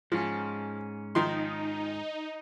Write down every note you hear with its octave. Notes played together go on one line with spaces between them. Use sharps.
G#2 F3 C#4
D#3 F3 D#4 C6